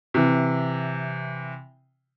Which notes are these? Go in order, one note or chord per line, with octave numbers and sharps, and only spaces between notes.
C3 E3